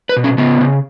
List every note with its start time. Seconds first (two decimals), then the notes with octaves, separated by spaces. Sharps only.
0.09 B4
0.16 B2
0.24 C#4
0.38 C#3 B3
0.61 C#3